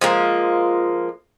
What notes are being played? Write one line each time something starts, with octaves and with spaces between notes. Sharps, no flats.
F3 G#3 A#3